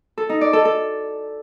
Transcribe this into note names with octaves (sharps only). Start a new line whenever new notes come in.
A4
D#4
D5
A4
A4